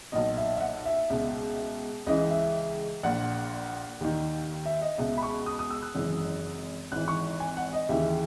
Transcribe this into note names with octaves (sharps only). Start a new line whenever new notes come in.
B1 A#2 D#5
E5
E5
F#5
E5
C#2 B2
C#2 C#3 E3 D#5
E5
A#1 A#2 F#5
D#2 D#3
E5
D#5
C#2 B2 E5
B5
C#6
D#6
D#6
E6
F#6
G#1 F#2 C#3 E3
G#1 G#2 E3 F#6
C#6
G#5
F#5
D#5
D#2 C#3 E3 E5